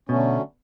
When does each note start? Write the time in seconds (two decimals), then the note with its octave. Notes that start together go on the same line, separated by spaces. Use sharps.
0.09 B2 D3 F#3 A3 C#4